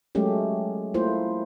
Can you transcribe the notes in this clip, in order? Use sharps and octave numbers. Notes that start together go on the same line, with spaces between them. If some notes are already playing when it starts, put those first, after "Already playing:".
F#3 G#3 A3 C#4 G4
A3 A#3 E4 F4 C5